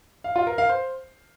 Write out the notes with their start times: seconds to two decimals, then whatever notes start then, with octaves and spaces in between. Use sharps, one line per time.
0.24 F5
0.36 F4
0.47 A#4
0.58 F5
0.69 C5